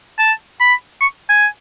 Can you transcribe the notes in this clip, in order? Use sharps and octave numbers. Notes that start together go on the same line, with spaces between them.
A5
B5
C#6
G#5